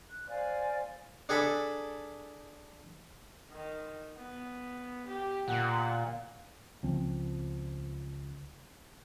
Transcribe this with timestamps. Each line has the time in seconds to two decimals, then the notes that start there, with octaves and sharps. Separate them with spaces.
0.08 F#6
0.28 C5 D5 F5 G#5
1.29 D4 G#4 A4 B5
3.52 D#3
4.18 B3
5.08 G4
5.48 A#2 F#5
6.83 C#2 F3 C4